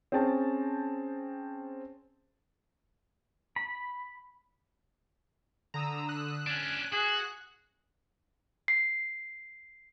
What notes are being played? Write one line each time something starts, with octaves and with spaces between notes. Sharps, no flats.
C4 C#4 G#4 G5 A5
B5
D3 A#5 D#6 E6
F#6
C#4 D4 G#6
F#4 G#4
C7